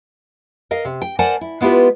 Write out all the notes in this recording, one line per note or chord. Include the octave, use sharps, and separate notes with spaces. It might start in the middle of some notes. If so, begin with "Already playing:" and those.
A#4 D#5 F5
C3
G5
A#4 C5 D5 F#5 G#5 A5
E4
G#3 B3 E4 F4 G4 B4